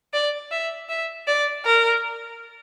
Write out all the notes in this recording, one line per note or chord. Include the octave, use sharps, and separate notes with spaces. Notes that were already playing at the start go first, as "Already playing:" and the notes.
D5
E5
E5
D5
A#4